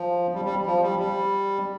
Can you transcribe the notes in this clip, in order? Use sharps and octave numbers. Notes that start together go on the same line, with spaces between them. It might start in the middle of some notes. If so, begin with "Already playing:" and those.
Already playing: F3
G3
G3
F3
G3
G3